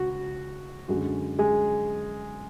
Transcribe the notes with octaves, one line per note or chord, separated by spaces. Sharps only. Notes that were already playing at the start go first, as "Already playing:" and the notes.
Already playing: C#2 F#4
F#2 D3 G#3 F#4
G#3 G#4